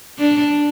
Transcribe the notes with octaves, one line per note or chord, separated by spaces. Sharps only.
D4